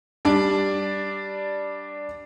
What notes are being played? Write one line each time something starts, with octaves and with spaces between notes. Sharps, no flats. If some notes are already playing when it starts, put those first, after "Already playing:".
G3 D4 D5